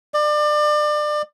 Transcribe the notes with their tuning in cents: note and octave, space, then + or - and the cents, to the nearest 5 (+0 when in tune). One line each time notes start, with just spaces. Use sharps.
D5 +30